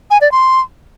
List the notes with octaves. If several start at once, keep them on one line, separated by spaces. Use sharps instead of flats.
G#5
D5
C6